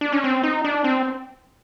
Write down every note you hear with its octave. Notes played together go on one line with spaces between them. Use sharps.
D4
C#4
C4
D#4
D4
C4